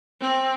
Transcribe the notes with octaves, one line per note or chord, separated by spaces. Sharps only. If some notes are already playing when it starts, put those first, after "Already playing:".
C4